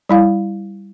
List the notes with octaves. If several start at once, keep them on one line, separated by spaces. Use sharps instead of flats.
G3 E4 F5